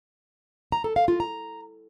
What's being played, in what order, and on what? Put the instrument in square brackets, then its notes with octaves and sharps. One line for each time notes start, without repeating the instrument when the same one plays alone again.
[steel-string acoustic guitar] A#5
A4
F5
F4
A#5